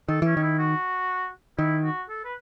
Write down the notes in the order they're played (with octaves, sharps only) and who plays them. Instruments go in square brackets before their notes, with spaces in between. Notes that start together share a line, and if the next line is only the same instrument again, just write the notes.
[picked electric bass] D#3 [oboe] A4
[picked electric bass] E3 [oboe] C#4
[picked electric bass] D#3
[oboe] E4
F#4
[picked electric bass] D#3 [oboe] E4
[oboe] F#4
A4
B4